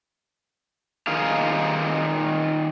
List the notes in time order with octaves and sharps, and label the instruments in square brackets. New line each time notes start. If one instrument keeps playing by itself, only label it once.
[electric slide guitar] D#3 D#4 F4 G#4 F5